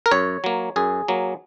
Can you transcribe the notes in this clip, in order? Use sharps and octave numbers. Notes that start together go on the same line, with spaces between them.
A#4
F#2 C#5
F#3 A#3
F#2 G#4
F#3 A#3